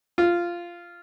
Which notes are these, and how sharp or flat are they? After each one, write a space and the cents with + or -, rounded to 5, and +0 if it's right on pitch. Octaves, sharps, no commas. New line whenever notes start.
F4 -10